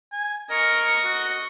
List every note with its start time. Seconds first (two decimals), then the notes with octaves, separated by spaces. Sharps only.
0.12 G#5
0.50 A#4 D#5 C#6
1.05 F#4